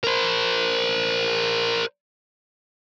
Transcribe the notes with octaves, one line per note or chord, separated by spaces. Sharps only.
A#4 C5